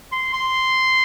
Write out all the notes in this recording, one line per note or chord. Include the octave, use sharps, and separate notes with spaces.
C6
C6